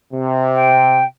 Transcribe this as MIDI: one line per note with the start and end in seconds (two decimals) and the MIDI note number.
0.13 1.03 48
0.55 1.04 79